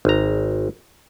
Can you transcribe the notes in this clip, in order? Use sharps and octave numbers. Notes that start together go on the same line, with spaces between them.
G#1 A#5